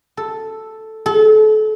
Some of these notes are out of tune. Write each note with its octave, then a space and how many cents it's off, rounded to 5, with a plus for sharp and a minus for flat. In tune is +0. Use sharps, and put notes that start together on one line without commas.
A4 +0
A4 -35